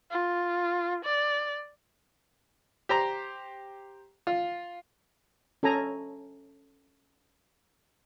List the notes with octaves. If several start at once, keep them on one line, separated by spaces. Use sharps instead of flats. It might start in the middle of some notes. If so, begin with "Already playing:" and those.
F4
D5
G4 C5 A#5
F4
C#4 A4 G#5 A#5